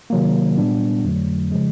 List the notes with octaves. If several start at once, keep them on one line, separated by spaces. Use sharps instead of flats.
C3 D#3 F#3 A#3
A#2 G3 B3 D4
F2 D3 F#3 A3
C#3 F3 G#3